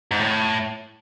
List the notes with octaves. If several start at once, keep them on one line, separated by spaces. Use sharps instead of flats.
G#2
A2